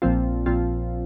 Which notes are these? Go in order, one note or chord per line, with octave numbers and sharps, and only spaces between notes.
A#1 A#2 F3 C4 F4
A#1 A#2 F3 C4 F4